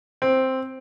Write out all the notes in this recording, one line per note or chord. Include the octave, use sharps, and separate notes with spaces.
C4